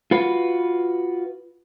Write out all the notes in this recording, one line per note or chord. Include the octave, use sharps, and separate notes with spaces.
F4 F#4 B4